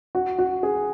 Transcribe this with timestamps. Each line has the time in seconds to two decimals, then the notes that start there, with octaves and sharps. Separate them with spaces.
0.15 F#4
0.39 F#4
0.63 G#4